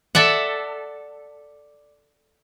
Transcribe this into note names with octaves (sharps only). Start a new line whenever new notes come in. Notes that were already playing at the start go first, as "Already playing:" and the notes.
A4 D5 E5 F#5